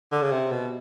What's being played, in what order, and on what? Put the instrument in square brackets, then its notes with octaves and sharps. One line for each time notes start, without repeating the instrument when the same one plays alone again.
[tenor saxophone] D3
C#3
C3
B2